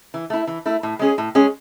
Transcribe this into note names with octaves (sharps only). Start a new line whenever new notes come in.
E3
A3 E4
E3
A3 E4
A2
G#3 C#4 G#4
A2
G#3 C#4 G#4